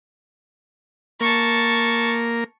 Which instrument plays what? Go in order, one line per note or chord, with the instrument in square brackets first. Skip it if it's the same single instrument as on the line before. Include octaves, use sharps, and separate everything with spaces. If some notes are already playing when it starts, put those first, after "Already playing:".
[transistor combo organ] A#3 [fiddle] A5 C#6